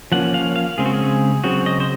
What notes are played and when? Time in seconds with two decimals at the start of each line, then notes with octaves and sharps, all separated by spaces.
0.12 F3 A#3 C#4 F#5
0.34 F5
0.56 F5
0.78 C#3 G#3 C4 G#4
0.86 F#4
0.94 G#4
1.44 C#3 F#3 C4 F#4
1.66 D#5
1.80 C5